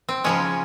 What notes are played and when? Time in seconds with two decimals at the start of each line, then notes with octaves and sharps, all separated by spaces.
0.09 C4
0.24 C#3 F3 G#3 C#4